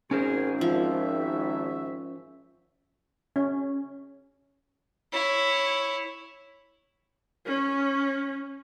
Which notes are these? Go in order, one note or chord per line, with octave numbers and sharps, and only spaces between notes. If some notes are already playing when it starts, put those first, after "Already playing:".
G#1 C#4 G#4 A#4 C5
F3 E5
C#4
E4 C#5
C#4